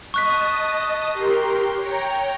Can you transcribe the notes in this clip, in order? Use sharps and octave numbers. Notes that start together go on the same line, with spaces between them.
D#5 A5 C#6 D#6 F#6 B6
G4 A#4 C6
C#5 G5 A#5